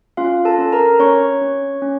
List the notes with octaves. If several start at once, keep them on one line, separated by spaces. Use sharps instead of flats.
C#4 F4 F5
A4 A5
C#4
A#4 A#5
C#4 C#5 C#6
C#4
C#4